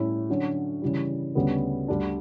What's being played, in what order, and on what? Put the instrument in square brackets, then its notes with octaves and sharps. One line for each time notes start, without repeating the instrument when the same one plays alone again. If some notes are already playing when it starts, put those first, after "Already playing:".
Already playing: [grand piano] A2 G3 C#4 E4
D3 F#3 C#4 F#4
C#3 E3 G3
D2 C#3 G3 B3
D2 D3 G3 D4